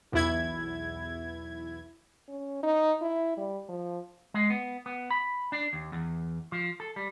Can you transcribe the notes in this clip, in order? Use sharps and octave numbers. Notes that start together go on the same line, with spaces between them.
B1 E2 E4 G#6
C#4
D#4
E4
G3
F3
G#3
B3
B3
B5
D4
D#2
E2
F3
A4
G3